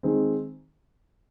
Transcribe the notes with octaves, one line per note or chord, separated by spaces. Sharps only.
D#3 G#3 C4